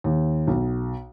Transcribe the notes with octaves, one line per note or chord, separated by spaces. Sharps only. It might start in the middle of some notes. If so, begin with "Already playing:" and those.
D#2
B1